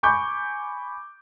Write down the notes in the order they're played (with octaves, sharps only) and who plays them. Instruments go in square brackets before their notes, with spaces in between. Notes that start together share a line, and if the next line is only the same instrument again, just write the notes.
[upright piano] G#5 B5 C#6 D6 G6